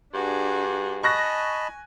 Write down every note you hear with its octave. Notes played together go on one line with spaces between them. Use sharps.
G2 D4 F#4 G#4
D#5 G#5 A5 B5 C#6 F#6 A#6